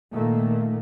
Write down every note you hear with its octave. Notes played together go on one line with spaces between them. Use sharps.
A#2 D#3 A3 A#3